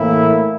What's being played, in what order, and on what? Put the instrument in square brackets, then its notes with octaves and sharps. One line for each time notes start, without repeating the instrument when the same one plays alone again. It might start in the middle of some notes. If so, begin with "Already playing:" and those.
Already playing: [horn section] A2 E3 A#3 E4